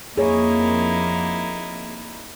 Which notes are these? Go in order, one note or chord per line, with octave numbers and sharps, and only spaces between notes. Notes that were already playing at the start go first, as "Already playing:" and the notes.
F2 A#3 D#4 E4 G#4 C#5